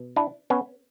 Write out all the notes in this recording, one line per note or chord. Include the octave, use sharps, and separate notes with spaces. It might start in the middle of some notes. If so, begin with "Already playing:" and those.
Already playing: B2
D4 E4
B3 C#4